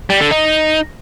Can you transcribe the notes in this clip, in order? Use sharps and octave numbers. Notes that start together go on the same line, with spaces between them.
G3
D3
D#4